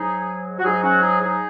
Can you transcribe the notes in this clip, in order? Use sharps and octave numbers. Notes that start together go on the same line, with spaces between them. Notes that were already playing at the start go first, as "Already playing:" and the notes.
Already playing: G#2 F#3 D#4 G#4
F#4
G#2 F#3 D#4 G#4
C#4 F#4
D#4 G#4
D#4 G#4